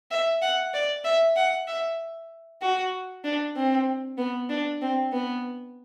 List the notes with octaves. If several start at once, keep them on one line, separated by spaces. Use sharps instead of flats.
E5
F#5
D5
E5
F#5
E5
F#4
D4
C4
B3
D4
C4
B3